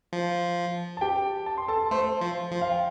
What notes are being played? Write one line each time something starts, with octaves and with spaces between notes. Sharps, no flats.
F3
A5
G4 G5
A5
C6
A4 A5
A3 C5 C6
F3
F3
F5
G5